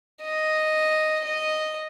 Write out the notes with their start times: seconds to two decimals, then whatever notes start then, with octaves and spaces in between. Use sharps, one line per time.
0.22 D#5
1.24 D#5